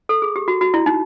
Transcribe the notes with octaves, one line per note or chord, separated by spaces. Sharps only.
A4
G#4
G4
F#4
F#4
E4
D#4